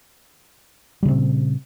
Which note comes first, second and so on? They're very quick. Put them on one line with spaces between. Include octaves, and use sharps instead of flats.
G3 C#3 C4 A#2